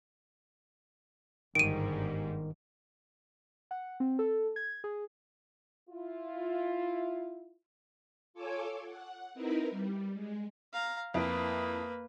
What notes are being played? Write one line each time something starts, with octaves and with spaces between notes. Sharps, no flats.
G1 G#2 D#3 G3 D7 D#7
F#5
C4
A4
G#6
G#4
E4 F4
F4 A4 C#5 G#5 D6 E6
F#5
C4 D#4 E4 A#4 B4
G3
G#3
F5 A#5
F2 A#3 E4 B4 D7